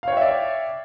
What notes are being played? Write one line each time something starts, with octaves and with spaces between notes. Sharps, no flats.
C#5 D5 E5 F5 G5